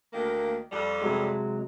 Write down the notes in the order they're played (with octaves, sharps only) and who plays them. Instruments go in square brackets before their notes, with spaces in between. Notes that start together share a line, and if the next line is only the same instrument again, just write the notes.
[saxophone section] D2 D#3 A#3
F2 G3
[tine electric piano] C3 F#3 G#3